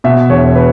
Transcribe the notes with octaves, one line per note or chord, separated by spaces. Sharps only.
B2 E5
E1 C#5
B4